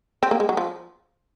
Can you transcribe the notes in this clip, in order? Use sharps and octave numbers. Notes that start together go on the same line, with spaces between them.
C4
A#3
G#3
F#3
F3